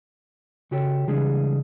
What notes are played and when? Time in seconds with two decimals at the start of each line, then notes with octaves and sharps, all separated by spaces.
0.71 C#3 F#4 G4 A4 C#5
1.08 C#3 E3 G3 G#3 D4 G#4